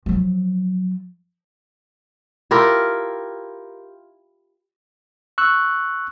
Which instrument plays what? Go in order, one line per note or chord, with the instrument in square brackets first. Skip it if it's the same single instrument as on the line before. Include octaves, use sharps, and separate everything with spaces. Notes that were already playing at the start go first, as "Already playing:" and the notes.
[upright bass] F3 F#3
[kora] E4 F4 G4 A#4
[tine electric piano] C#6 E6 F#6